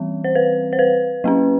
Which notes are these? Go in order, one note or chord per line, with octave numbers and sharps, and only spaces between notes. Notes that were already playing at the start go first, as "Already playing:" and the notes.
Already playing: E3 G3 C4
C5
B4
C5
B4
F#3 A#3 C#4